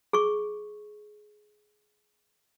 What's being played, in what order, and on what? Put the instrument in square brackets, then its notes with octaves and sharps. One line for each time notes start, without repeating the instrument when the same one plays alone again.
[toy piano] G#4 C#6